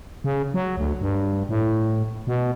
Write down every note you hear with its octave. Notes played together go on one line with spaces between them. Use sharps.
C#3
F#3
D2
G2
A2
B2